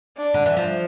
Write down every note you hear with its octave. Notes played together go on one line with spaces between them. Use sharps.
D4
D3
E3
F3